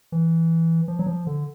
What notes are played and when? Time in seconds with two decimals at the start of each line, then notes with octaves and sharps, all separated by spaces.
0.12 E3
0.88 F3
0.99 F#3
1.06 F3
1.27 D3